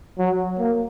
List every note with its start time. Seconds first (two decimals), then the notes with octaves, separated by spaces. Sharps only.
0.19 F#3
0.59 A#3